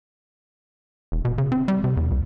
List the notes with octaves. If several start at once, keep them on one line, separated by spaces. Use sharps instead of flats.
E1
B2
C#3
C4
G3
C3
E2
C#2